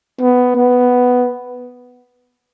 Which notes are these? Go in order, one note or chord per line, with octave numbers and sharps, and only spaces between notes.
B3
B3